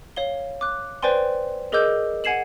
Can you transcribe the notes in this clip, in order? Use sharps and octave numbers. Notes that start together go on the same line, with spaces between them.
C#5 F5 G7
D6 F#6
B4 C5 D5 G5 G#5 C6
G#4 A#4 D#5 D6 E6 G6
F#5 G#5 G#6 C7 E7 F#7